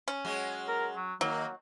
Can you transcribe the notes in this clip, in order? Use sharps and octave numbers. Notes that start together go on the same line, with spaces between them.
C#4
F#3 G#3 F#4
A#4
F#3
D#3 F#3 A#3 C4